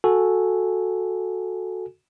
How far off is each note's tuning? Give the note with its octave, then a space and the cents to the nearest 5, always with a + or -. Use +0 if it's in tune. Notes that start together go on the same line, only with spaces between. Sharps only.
F#4 -10 A4 +0 G#5 +0